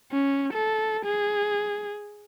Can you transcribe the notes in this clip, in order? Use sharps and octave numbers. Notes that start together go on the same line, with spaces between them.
C#4
A4
G#4